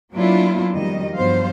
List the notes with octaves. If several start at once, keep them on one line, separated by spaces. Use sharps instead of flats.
F#3 A#3 B3 D4 E4 F4
F2 D#3 F#3 G3 D#5
G2 F3 F#3 B3 C5 F5